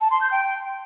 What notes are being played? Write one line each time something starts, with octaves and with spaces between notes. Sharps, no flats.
A5
C6
G6
G5